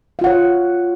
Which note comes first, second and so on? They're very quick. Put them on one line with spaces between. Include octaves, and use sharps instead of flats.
F5 F4 F#5 C#5